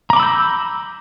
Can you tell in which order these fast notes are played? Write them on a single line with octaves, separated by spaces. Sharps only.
A#5 D6 B5 E6 G6